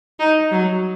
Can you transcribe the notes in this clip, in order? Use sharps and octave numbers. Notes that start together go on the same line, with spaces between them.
D#4
F#3